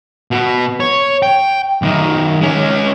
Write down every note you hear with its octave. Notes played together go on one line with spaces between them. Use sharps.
B2 B3
C#5
G5
B1 D#3
G#3 C#4